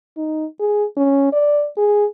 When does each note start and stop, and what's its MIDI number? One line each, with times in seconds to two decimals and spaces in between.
0.17 0.45 63
0.60 0.84 68
0.97 1.29 61
1.33 1.67 74
1.77 2.05 68